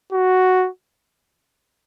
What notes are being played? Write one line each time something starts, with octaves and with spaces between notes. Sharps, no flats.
F#4